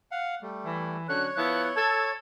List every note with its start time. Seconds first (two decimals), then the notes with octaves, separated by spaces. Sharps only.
0.11 F5 F#5
0.42 G3 A3
0.64 E3
1.08 D3 F#3 C#4 C#5 F#6
1.35 F3 B3 E4 F#6
1.76 A4 G#6